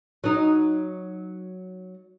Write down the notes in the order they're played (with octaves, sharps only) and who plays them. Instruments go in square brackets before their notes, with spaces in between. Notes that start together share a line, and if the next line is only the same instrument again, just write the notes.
[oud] F#3 D#4